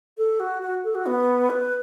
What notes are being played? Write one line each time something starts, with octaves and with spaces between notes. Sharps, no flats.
A4
F#4
F#4
A4
F#4
B3
B4